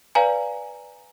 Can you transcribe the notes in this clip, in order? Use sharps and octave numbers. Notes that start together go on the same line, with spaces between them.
B4 D5 F5 G#5 A#5